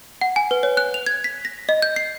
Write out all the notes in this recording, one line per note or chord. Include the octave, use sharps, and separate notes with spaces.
F#5
G#5
B4
C#5
F#6
F7
G#6
B6
A#6
D#5
G6
C7